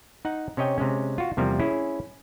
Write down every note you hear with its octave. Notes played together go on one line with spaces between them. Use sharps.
D#4 F#5
C3 C#4 C#5 D#5 G5
C3 G#3 C#4
F4 F#4
E2 C3 F3 G3 A#3
C#4 E4 G#4